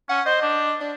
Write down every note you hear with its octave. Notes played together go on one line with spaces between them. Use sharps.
C#4 F#5
C5 D#5
D4
D4